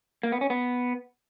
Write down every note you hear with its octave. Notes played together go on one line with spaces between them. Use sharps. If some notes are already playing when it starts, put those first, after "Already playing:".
A#3
B3
C#4
B3